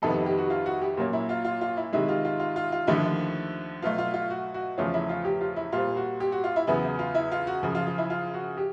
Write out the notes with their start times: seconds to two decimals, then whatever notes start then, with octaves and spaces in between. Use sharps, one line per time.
0.02 F2 C3 D#3 G3 B3 A4
0.26 G4
0.38 F#4
0.50 F4
0.66 F#4
0.81 G4
0.97 A#2 F#3 A#3 C#4
1.13 E4
1.29 F4
1.44 F4
1.61 F4
1.77 E4
1.92 C3 D#3 G#3 E4
2.08 F4
2.25 F4
2.40 F4
2.56 F4
2.72 F4
2.87 D#2 D3 F3 A3 E4
3.82 B2 F#3 A3 F4
3.98 F4
4.14 F4
4.30 F#4
4.54 F#4
4.78 E2 C#3 F3 A3 C#4 F4
4.94 E4
5.09 F4
5.25 G4
5.41 F4
5.56 E4
5.72 A#2 G3 C4 F4
5.96 F#4
6.20 G4
6.32 F#4
6.44 F4
6.56 E4
6.67 E2 C#3 F#3 B3 E4
6.99 F4
7.15 E4
7.32 F4
7.47 F#4
7.63 F#2 C#3 F3
7.75 F4
7.87 F4
7.98 E4
8.10 F4
8.34 F#4
8.57 G4